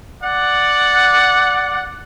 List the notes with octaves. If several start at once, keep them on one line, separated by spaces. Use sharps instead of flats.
D5 F#5